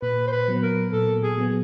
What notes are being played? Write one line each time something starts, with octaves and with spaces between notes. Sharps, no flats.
A#2 B4
C5
B4
F#3 B3
A#4
A#2 A4
G#4
F#3 B3